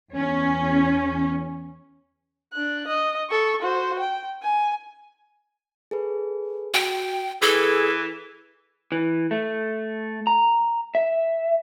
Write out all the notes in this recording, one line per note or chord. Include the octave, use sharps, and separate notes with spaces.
E2 C#4
D4 F#6
D#5
A4 C#6
F#4 C5
G5
G#5
G#4 A4 B4
F#4 G5
E3 G#4 A4 B4
E3
A3
A#5
E5